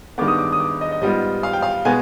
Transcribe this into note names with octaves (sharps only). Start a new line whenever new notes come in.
G2 D#3 G#3 B3 D6
D#6
D6
D#6
D6
D#5
D#5
G#2 G3 B3 F4 D#5
F5
G5
F5
B2 G#3 B3 G#5